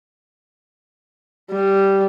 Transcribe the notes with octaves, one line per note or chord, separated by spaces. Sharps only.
G3